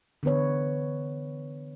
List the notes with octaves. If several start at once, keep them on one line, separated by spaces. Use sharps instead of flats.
D3 E3 B3 B4 C#5